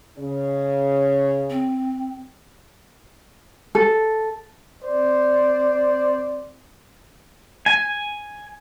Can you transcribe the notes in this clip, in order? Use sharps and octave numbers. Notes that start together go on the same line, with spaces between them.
C#3 C#5
C4
A4
C4 C5 D5
G#5